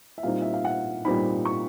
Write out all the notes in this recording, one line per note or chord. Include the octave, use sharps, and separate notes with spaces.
E5
A#2 G3 C4 D#4 F5
E5
F5
F#5
A#2 G3 C4 D#4 B5
C#6